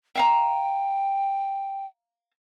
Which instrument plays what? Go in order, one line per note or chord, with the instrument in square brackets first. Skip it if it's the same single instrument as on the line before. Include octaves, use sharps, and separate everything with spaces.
[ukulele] E5 F5 A#5 [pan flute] G5